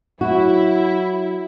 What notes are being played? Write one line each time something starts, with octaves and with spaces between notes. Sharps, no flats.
F#3 E4 F#4